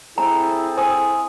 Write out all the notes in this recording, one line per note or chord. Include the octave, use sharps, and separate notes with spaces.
C4 E4 G#4 A4 A#5
E4 C5 G#5 D#6